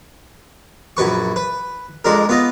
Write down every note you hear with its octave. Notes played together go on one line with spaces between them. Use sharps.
A#1 F#2 B4 C#6
B4
F2 G#3 D4 A#4
B3 F4 D#5